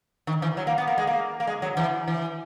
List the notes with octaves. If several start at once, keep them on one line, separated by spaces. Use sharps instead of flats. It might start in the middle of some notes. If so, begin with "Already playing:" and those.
D#3
E3
F#3
A#3
B3
A#3
G#3
A#3
A#3
G#3
F#3
E3
E3